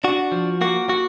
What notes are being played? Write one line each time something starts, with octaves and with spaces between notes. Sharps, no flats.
D4 F#4
F3
A#3 F#4
F#4